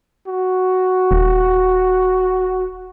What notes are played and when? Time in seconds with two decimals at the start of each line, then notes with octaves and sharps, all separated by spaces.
0.27 F#4
1.11 D#1